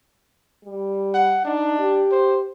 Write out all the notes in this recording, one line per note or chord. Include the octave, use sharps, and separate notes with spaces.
G3
F#5
D4 D#4
G4
C5